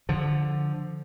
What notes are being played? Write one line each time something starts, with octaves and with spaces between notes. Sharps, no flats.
D3 F3